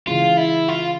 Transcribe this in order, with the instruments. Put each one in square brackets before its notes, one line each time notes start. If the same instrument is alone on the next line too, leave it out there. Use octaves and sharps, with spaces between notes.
[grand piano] C#3 E3 G#3 C#4 [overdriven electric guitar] F4
[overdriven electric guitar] E4
F4